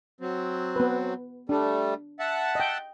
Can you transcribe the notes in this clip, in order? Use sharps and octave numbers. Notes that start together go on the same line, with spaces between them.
F#3 C4
B3 B4
G3 A3 D4
E5 F#5 A5
D#5 G5